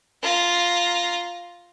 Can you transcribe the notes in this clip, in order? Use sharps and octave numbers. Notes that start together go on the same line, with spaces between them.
F4 A#5